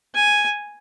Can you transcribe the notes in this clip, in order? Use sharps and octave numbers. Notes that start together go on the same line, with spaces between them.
G#5